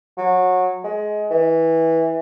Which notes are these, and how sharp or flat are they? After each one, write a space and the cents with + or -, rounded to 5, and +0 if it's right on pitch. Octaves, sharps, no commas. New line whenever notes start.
F#3 -20
G#3 +20
E3 -10